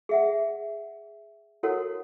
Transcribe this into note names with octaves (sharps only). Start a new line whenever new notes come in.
G#4 E5 F#5
E4 F#4 A4 A#4 C#5 F#5